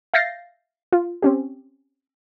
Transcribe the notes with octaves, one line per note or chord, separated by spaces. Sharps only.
E5 F5 G6 A6 A#6 C7
F4
C4 C#4 G4